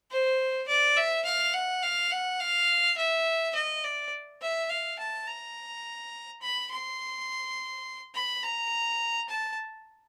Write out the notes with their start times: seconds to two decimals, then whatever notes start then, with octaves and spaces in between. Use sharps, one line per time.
0.11 C5
0.68 D5
0.97 E5
1.25 F5
1.54 F#5
1.83 F5
2.11 F#5
2.40 F5
2.97 E5
3.55 D#5
3.84 D5
4.42 E5
4.70 F5
4.99 A5
5.28 A#5
6.42 B5
6.71 C6
8.15 B5
8.43 A#5
9.29 A5